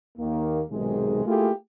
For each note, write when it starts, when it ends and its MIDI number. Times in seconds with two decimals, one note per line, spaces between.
0.18 0.62 39
0.18 0.62 51
0.18 0.62 58
0.71 1.24 35
0.71 1.24 44
0.71 1.24 48
0.71 1.24 51
0.71 1.24 56
1.26 1.51 57
1.26 1.51 58
1.26 1.51 64
1.26 1.51 65
1.26 1.51 67
1.26 1.51 68